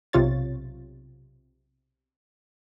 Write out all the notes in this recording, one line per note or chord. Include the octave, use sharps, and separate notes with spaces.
B1 C3 F4 C#5 A6